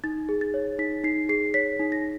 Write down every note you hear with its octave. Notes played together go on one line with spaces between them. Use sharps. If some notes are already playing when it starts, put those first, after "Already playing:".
D#4 A6
G#4
A6
C#5
D#4 B6
D#4 C7
G#4 C7
C#5 B6
D#4
A#6